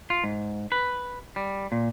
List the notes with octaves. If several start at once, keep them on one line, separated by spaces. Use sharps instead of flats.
F4
G#2
B4
G3
A#2